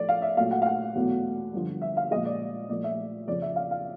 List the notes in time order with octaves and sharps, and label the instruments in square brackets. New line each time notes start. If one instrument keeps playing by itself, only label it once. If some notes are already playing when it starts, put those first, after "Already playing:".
Already playing: [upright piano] A2 F3 A3 D5
F5
E5
A#2 F#3 A3 F5
F#5
F5
F#5
E2 B2 F#3 A3
G2 D3 F3
E5
F5
A#2 F3 G#3 D#5
D5
A#2 F3 A3 D5
E5
F2 C#3 F3 D5
E5
F5
F5